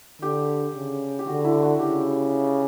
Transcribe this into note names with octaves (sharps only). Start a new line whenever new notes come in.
D3 G4
C#3
G4
D3 F#4
E4
F#4
C#3 G4